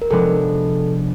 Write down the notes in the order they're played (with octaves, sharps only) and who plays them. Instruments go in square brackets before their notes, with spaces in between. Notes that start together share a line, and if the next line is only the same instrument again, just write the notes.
[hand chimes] A#4
[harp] C3 F3 G#3 B3 D4 [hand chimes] A4